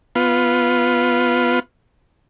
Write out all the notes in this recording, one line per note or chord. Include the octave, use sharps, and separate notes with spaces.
B3 F4